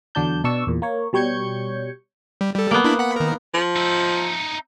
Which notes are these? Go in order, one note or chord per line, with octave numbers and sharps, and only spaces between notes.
E2 D3 F#3 D4 A5 G6
B2 D4 D5 C#6 E6
E2 A#2
A#3 C#5
B2 G3 C#5 G6 G#6 C#7
G3
G3 A4
A#3 B3
D4 E4 B5
F#5 B5
D#3 A#4
F3
D#4 E5